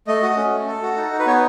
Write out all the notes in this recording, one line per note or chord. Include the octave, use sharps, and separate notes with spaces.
A3 D#5
F#4
C#4
A3
A4
F#4
D#4
D#4
B4
B3 C#5